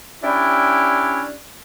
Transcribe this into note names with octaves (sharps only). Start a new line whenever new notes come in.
C#4 D4 E4 G4 D5